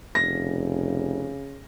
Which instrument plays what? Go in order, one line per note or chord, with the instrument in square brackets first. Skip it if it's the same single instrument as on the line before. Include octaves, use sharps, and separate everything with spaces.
[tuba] F1 [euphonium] C#3 [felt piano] A#6